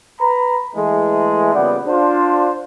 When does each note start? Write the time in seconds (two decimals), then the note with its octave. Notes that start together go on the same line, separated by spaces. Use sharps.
0.20 B4 A#5 B5
0.76 E3 G#3 A3
1.54 A#2 C#3 G3 B3 D5 F#5
1.87 D4 F4 C5